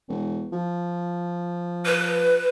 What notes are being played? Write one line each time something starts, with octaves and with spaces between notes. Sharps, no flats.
E1
F3
B4